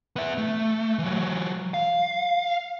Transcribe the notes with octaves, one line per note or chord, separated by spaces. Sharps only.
B3 E5
A3
E3 F#3
F5